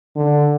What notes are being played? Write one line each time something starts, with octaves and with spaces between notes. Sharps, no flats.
D3